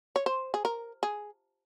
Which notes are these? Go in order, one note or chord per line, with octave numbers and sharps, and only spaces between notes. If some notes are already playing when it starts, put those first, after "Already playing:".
C#5
C5
G#4
A#4
G#4